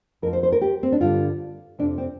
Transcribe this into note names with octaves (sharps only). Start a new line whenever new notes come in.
F2 F3 A#4
C5
C5
A#4
G4
C4
D4
G2 D3 G3 F4
F2 C3 F3 D4
C4